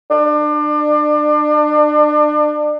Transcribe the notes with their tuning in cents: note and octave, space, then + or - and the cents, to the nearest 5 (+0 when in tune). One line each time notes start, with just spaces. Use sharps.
D4 +30